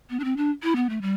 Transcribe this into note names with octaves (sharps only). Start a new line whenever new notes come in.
B3
D4
C4
D4
E4
B3
A3
G3